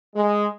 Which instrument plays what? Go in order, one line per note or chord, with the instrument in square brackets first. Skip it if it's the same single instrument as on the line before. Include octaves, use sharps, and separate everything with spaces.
[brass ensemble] G#3